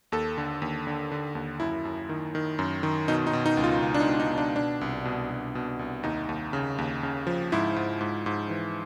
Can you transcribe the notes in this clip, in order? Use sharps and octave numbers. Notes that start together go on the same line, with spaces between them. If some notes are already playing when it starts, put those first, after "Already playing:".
D#2 A4
D3
D#2
D3
D3
D#2
F#2 E4
F#2
D#3
D#3
F#2
D#3
B2 D#4
D#4
B2
D#4
C#2
F4
C#2
D4
D#4
B2
D#4
B2
D4
B2 D4
C2
B2
B2
B2
C2
D#2 D#4
D#2
C#3
D#2
C#3
F3
G#2 E4
G#2
G#2
G#2
E3